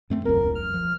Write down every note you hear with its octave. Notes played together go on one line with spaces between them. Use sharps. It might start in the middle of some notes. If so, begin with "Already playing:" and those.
F#2 A3 C4
E1 C#2 F#2 A#4
F6
F3